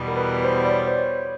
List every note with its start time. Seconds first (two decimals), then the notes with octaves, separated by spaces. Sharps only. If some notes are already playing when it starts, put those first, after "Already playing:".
Already playing: E2 B2 G3 B3
0.08 A#4
0.16 B4
0.44 C5
0.65 D5
0.71 C#5
0.87 C5
0.99 C#5